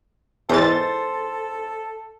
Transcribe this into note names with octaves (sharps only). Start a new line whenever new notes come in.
E2 G#2 A4 C5 A6